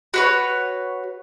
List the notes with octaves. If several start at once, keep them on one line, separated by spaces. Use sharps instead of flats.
F#4 B4 C#5